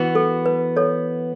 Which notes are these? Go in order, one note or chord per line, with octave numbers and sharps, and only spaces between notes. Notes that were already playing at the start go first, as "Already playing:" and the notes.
Already playing: E3 B3 F#4
A4
B4
A4 C#5